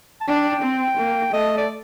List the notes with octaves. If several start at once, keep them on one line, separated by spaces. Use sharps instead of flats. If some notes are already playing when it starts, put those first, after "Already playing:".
A5
D4 G5
C4
A#3
A3 D#5
D5